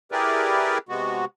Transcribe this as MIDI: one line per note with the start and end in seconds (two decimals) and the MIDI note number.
0.12 0.78 64
0.12 0.78 67
0.12 0.78 68
0.12 0.78 70
0.12 0.78 71
0.12 0.78 74
0.89 1.25 48
0.89 1.25 56
0.89 1.25 59
0.89 1.25 66